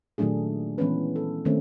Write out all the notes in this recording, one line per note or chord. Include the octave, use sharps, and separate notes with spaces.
A#2 D#3 F#3 A3 D4 G#4
E3 G#3 B3 C#4 B4
A4
D#3 G#3 A3 C4 C#4